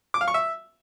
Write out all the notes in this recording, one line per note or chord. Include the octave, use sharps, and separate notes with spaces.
D6
F5
C#6
E5